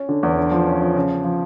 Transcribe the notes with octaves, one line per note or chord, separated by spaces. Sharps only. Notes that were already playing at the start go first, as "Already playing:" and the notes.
Already playing: C#4
D3
E2
D3
F3
C#4
F3
C#3
C#3
F3